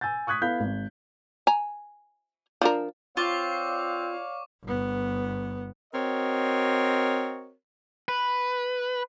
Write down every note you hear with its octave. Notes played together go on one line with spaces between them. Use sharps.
G#5 E6 G6 A6
C#6 D#6 F#6 G#6 B6
B3 E4 A4 F5 G6 B6
G#1
G#5 A#5
F3 D4 A#4
C4 F4 C#5 D5 F5 C#6 D6
G1 B3
C4 F#4 A#4 C#5 D#5
B4